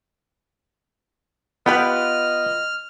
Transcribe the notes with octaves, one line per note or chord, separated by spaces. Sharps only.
B3 F4 G4 B4 D#5 F6